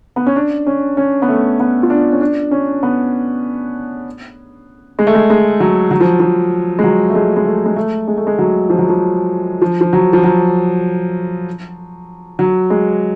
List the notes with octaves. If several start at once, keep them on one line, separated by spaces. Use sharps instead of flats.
B3
C#4
D4
C#4
C#4
B3
A3
B3
F4
D4
C#4
D4
C#4
B3
G#3
A3
G#3
G#3
F#3
F#3
F3
F3
G#3
F#3
A3
G#3
G#3
A3
G#3
A3
G#3
A3
G#3
F#3
F3
F#3
F3
F3
F3
F#3
F3
F#3
F#3
G#3